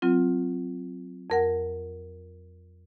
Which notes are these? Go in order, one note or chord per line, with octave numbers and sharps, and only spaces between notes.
F#3 C4 F4
F2 A#4 F#5